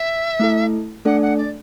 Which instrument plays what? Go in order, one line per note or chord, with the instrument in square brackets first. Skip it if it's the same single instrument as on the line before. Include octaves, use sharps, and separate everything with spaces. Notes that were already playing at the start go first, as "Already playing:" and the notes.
Already playing: [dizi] E5
[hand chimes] A3 E4 A4
[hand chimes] A3 D4 A4 D5 [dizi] F#5
[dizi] F#5
D5